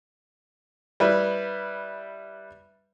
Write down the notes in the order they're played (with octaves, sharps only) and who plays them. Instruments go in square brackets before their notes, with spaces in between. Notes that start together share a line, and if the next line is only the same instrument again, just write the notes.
[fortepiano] G3 E4 B4